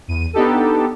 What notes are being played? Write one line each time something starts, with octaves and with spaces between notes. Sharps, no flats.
E2 D#7
B3 D4 D#4 G4 A4